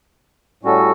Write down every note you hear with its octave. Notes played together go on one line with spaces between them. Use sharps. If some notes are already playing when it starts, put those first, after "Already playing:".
A2 G3 C#4 F#4 A4